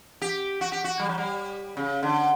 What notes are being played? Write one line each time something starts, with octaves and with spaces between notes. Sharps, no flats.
G4
F#4
G4
F#4
G3
F#3
G3
C#3
D3